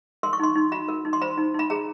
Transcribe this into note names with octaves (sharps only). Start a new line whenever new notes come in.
A#4 C6
C#6
D#4 C6
D#4
F#4 B5
A#4
D#4
C6
C5 B5
D#4
D#4 B5
G#4 A#5